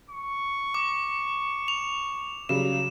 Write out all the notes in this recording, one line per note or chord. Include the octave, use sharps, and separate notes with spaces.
C#6
D6
F7
C#3 F#3 G3 E7